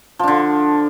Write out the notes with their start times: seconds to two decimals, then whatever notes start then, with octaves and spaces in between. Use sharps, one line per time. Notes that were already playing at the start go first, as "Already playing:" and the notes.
0.19 F3
0.24 D4
0.28 D3